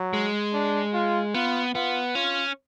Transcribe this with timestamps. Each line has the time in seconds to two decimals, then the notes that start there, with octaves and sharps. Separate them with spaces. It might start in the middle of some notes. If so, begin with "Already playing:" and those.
Already playing: F#3
0.13 G#3
0.53 D4
0.94 F4
1.34 B3 F4
1.74 B3 F4
2.15 C#4 F4